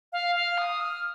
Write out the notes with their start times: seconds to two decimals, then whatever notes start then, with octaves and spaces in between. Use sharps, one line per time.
0.13 F5
0.36 F5
0.58 D#6
0.81 F6